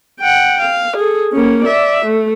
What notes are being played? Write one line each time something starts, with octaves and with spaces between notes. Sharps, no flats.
F#5 G5
F5
G#4 A4
A#3 C#4
D5 E5
A3